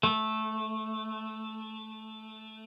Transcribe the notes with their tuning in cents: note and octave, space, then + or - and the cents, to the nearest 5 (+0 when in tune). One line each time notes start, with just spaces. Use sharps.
A3 -10